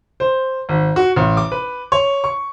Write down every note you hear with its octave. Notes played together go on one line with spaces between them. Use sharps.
C5
G#1
F#4
A1
D6
B4
C#5
C#6